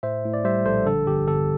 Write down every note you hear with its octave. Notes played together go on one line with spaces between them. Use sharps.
A2 C5 E5
A2
D5
G3 C5 E5
A#1 A4 C5
D3 A4
G1 G4
G1 A4